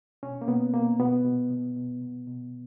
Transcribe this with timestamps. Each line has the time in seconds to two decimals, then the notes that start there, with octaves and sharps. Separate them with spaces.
0.23 B2 C#4
0.41 A#3
0.48 B2 B3
0.74 B2 A#3
1.00 B2 B3
1.25 B2
1.51 B2
1.76 B2
2.02 B2
2.27 B2